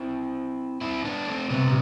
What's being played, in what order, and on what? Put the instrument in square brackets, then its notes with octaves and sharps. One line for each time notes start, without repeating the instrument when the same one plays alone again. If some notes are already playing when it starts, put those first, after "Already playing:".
Already playing: [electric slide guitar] C4 E4
C4 E4
B3 D4
A3 C4
[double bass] C3 [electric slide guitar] G3 B3